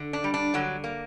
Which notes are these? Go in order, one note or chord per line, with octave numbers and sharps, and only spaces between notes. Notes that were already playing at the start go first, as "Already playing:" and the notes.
Already playing: D3
D4
G3
D4
D3 F#3 F#4
A#3